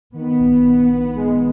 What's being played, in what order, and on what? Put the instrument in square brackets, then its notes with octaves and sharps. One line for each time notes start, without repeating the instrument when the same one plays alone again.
[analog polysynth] D#3 [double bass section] B3
[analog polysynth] A#1
A#1
A#1
G#3